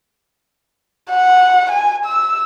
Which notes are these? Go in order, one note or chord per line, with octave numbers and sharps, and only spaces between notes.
F#5
G#5
E6